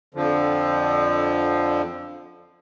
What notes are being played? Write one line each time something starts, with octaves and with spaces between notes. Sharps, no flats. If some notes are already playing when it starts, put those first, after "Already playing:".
F2 D3 F3